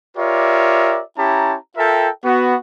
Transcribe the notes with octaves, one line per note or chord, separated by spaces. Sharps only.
F4 G4 A#4 C#5 D5 E5
C#4 E4 G4 A5 A#5
F4 A4 A#4 E5 G5
B3 F#4